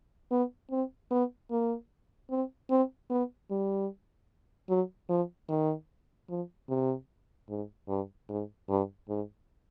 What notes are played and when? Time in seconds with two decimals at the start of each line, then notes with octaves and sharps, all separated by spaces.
0.31 B3
0.71 C4
1.11 B3
1.51 A#3
2.30 C4
2.70 C4
3.10 B3
3.51 G3
4.69 F#3
5.09 F3
5.49 D#3
6.29 F3
6.69 C3
7.49 G#2
7.88 G2
8.29 G#2
8.69 G2
9.09 G#2